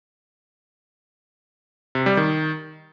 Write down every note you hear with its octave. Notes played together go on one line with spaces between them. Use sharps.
C3
G3
D#3